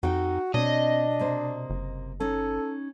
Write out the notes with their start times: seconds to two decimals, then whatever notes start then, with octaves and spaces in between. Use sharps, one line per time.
0.03 F2 D#4 F#4 A4 G5
0.54 B2 C4 D4 C#5 D#5
1.19 C3 A#3 C5
1.70 F#1
2.20 C#4 D#4 A4